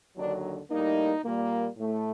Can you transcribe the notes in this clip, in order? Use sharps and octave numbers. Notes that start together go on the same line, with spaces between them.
D#2 D3 F#3 D4
A2 G3 A#3 D#4
A#2 G3 A#3
A2 A3